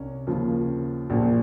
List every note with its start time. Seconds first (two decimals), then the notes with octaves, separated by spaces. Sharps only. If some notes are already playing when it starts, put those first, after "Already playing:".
Already playing: C2 C#4
0.27 D#2 C#3 F3
1.10 A#1 A#2 F3